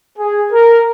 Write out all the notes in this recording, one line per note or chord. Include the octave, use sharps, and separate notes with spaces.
G#4
A#4